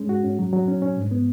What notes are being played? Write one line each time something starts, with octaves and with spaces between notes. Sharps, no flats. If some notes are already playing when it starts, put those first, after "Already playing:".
Already playing: G#3 C#4
F#4
C#4
F#3
F#3
C#4
C#4
G#2
B3